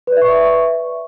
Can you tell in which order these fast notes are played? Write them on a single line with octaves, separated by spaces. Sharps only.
B4 D5 E5 C#6